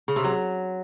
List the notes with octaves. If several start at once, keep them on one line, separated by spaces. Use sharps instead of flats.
C#3
C3
F#3